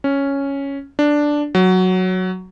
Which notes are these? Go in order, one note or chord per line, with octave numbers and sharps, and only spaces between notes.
C#4
D4
F#3